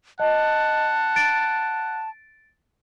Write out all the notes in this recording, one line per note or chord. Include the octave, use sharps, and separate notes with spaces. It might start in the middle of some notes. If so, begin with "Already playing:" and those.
D#5 F#5 A5
A6 D7